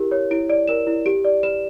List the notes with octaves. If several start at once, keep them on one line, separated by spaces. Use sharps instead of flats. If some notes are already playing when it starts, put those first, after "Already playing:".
Already playing: E4 G4 A#4
C#5
E4 D7
D5 D7
A#4 E7
E4
G4 D7
D5
B4 E7